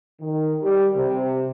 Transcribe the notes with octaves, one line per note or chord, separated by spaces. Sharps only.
D#3
G3
C3